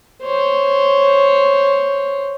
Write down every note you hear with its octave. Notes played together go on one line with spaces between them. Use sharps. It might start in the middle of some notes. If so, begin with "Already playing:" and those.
C5 C#5